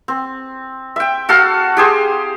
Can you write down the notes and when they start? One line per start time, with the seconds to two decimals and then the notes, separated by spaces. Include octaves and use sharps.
0.08 C4
0.96 E5 G5
1.29 F#4 A4 F5
1.77 G4 G#4 C5